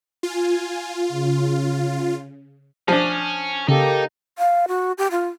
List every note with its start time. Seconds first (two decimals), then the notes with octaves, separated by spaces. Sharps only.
0.23 F4 G#5
1.08 C#3
2.88 F3 C#4 D4
3.68 C#3 A#3 D#4 G4 A4
4.38 F5
4.68 F#4
4.98 G4
5.11 F4